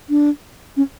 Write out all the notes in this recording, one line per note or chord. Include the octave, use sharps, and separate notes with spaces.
D4
C#4